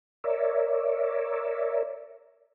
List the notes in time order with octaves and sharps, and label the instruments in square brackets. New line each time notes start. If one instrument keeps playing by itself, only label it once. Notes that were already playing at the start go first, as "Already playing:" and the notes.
[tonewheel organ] A#4 C#5 D5 E5